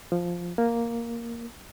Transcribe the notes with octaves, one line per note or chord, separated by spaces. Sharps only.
F3
A#3